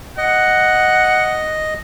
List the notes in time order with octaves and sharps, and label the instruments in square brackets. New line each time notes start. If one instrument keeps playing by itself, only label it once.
[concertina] D#5 [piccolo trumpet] F#5